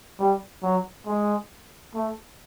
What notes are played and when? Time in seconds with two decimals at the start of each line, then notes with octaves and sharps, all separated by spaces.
0.19 G3
0.63 F#3
1.07 G#3
1.94 A3